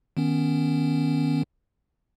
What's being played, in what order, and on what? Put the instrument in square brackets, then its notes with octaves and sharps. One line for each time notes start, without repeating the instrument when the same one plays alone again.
[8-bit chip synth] D#3 B3 C#4